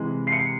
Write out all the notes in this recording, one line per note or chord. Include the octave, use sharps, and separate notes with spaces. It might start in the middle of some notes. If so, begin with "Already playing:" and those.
Already playing: C3 E3 G#3
C7
C#7